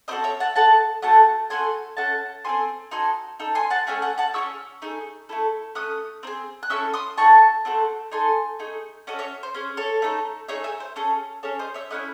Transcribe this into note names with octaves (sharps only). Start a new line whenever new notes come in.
C4 F#4 A4 C5 D#5
C#5 E5
F#5 A5
D#4 A4 F#5 A5
A3 C4 F#4 A4 F#5 A5
A3 C4 F#4 A4 G#5 C6
C#4 E4 A4 F#5 A5
C4 E4 A4 G#5 C6
D#4 F#4 A4 G#5 C6
D#4 A4
G#5 C6
F#5 A5
A3 C#4 G#4 E5 G#5
F#5 A5
F#5 A5
C#4 E4 G#4 C#6 E6
A3 D#4 G#4
A3 C4 E4 A4
A3 C#4 D#6 F#6
C4 D#4 G#4
F#6
C#4 E4 A4 C#6 E6
C6 D#6
D#4 F#4 A4 A5 C#6
A3 C4 F#4 A4
D#4 A4 G#5 C6
A3 D#4 G#4
C#4 F#4 A4 D#5
C#5 E5
C5
C#4 G#4 C5
A4 C#5
A3 D#4 A4
A3 D#4 G#4 C#5 E5
E5 G#5
C5
C#4 G#4 A4
C#4 G#4 A4 C#5
C5 D#5
C#5 E5
A3 C#4 E4 D#5 F#5